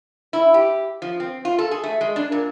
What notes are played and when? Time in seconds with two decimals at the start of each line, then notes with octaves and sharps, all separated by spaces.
0.33 E4
0.54 G4
1.02 F3
1.20 C4
1.45 F4
1.58 A4
1.71 G#4
1.83 A3
2.01 G#3
2.16 D4
2.32 A#2